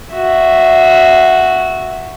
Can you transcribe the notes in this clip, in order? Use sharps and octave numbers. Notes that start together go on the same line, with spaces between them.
F#4 E5